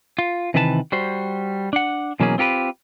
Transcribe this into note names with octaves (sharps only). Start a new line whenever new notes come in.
F4
C3 D#3 E3 B4 D#5 A5
G3 F#4 C5
D4 F#5
B2 E3 F#3 A#3 C#4 G#4
C4 F4 G4 A#4 B4